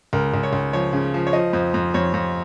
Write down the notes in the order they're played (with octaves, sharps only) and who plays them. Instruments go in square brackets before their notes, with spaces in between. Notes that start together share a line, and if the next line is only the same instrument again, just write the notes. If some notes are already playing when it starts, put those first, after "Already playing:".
[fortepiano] C#2 A#4
C#2
C#5
C#2
F3 C#5
C#3
F3
C#5
F3 D#5
F2
F2
F2 C#5
F2